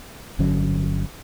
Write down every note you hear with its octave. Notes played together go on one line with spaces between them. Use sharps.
G1 D3 F#3 C#4